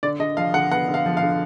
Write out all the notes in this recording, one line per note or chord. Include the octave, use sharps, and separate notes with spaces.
D3 D5
D3 D#5
F3 F5
D3 F#5
B3 F#5
D3
F5
F3
F5
D3